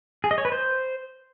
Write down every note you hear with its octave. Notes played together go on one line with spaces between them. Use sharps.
G#4
D#5
C#5
B4
C5